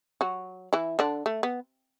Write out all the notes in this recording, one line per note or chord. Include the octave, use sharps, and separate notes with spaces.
F#3 F#4
E3 E4
D3 D4
A3
B3